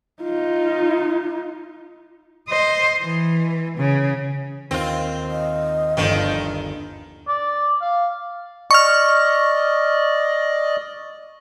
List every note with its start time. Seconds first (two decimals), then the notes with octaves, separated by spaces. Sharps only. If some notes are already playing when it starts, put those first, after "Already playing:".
0.23 D#4 F4
2.48 C5 D#5
3.02 E3
3.78 C#3
4.71 D#2 C4 F4
5.31 D#5
5.97 G1 D#3 F3 B3
6.22 A#5
7.28 D5
7.82 F5
8.71 D5 D#5 C#6 F6